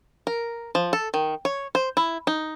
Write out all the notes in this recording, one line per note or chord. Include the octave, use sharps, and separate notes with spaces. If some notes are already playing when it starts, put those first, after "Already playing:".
A#4
F3
A4
D#3
C#5
C5
E4
D#4